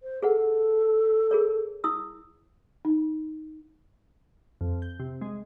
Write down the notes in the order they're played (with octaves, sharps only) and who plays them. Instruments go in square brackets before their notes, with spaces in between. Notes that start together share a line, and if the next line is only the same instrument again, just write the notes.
[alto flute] C5
[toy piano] G#4 B4 F#5 [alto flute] A4
[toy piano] G#4 A#4 C#5
E4 D#6 E6
[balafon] D#4
[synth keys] F2
G6
C3
G#3